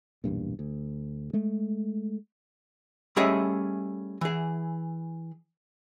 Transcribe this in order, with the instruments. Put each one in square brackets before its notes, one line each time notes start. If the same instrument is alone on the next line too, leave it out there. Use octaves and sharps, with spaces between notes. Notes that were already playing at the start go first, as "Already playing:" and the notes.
[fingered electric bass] B1 E2 G2 A#2
D2
G#3 A3
[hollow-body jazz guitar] G3 A3 C#4 G#4 D#5 E5
E3 G#4